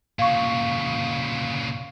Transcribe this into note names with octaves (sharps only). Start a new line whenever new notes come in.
A#2 C#3 F5 C#6